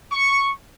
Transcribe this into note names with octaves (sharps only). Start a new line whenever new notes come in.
C#6